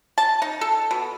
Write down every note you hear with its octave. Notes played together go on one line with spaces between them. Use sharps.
A5
D#4
A4
B2